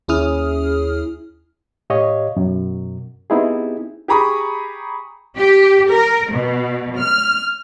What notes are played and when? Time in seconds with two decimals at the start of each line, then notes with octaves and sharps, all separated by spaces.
0.08 D#2 C#4 E4 G#4 D#6 F6
1.90 A2 G4 C#5 D#5 F5
2.37 F#2 B2
3.30 B3 C4 D#4 E4 G4 G#4
4.08 G4 G#4 A#5 B5 C#6 D#6
5.37 G4
5.90 A#4
6.30 B2
6.98 F6